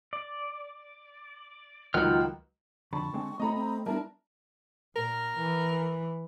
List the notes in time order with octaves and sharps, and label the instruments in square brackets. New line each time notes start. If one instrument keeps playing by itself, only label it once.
[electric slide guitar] D5
[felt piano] C#2 D#3 F#3 [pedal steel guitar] F4 G5 F6 [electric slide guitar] F#5
[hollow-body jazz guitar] F2 D3 B5 [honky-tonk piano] A5 [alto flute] C#6
[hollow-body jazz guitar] D3 G#3 C4
[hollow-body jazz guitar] A3 A4 [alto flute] C4 [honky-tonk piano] D#5 A#5 B5
[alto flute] C4
[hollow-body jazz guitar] G3 B3 D4 [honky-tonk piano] E4 A#4 [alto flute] A5
[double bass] A#2 [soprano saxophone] A#4
[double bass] E3